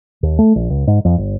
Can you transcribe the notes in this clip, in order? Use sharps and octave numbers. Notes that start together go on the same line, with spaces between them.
D#2
A3
A#1
C#2
G#2
F2
G1